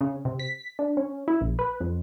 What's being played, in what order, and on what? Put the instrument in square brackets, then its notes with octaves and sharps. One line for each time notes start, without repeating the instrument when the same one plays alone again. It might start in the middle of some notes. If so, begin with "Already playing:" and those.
[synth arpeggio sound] C#3
C3
B6
D4
C#4
E4
A#1
B4
F2